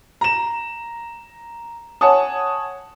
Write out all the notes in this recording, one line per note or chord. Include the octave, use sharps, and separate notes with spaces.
A#5 E7
C#5 F#5 G#5 A5 D#6